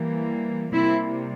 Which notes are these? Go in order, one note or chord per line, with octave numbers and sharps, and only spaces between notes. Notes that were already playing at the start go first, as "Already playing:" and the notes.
Already playing: E3 G3 A#3
C3 G3 A#3 C4 E4